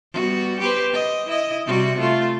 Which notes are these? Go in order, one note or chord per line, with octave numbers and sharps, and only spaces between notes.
G3 B3 F#4
G4 B4 C5
D#5
E4 D#5
C3 G3 F#4
A3 F4